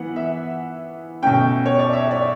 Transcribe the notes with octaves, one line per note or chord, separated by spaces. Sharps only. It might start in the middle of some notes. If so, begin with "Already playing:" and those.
Already playing: E3 B3 F#5
E5
B2 A3 C#4 G5
C#5
D5
E5
D5